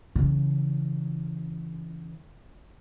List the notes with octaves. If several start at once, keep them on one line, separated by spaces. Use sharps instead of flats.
C#3 E3